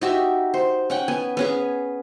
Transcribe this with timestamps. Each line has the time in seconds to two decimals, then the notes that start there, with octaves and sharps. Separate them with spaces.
0.01 D#4 F#4 G4 E5
0.54 C5
0.90 C#4 F#5 G5
1.08 B3 G#5
1.37 B3 C#4 G#4